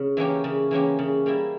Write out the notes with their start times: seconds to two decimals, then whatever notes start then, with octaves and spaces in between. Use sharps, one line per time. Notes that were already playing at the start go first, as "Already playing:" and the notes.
Already playing: C#3
0.17 E3 A#3 C#4 G4
0.44 C#3
0.71 E3 A#3 C#4 G4
0.99 C#3
1.26 G3 A#3 E4